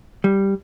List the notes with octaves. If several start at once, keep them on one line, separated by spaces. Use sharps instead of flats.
G3